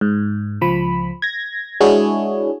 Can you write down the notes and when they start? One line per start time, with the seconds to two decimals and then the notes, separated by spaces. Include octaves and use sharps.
0.01 G#2
0.61 C#2 F3 B5
1.22 G#6 A#6
1.80 G#3 D4 E4 F#4 G#4 C#5